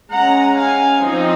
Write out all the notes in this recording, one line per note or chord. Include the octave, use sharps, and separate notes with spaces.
G#3 C#4 F#5 A#5
F5 G#5
F3 C4 D#4